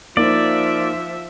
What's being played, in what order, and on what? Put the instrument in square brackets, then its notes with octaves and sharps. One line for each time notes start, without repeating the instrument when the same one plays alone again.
[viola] F3 E5 [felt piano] A#3 D#4 C5 [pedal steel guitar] D5